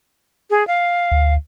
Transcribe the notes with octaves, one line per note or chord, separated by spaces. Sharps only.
G#4
F5
D2